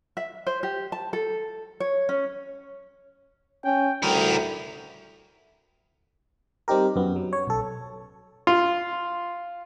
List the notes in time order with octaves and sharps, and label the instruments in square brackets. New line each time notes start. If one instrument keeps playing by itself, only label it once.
[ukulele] E5
C5
G4
A5
A4
C#5
C#4
[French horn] C#4 [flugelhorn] G5
[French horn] D2 [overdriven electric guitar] E4 A#4 [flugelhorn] G5
[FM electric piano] G3 C4 D#4 G4 A#4
F#2 B3
F#3
C#5
B1 A4
[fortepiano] F4